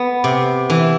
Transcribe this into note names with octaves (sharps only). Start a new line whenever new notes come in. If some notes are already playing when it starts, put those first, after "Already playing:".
Already playing: B3
C3
E3